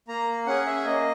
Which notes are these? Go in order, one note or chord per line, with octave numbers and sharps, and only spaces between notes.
A#3 A#5
C#4 G#4 F#5
E5
A#3 D#5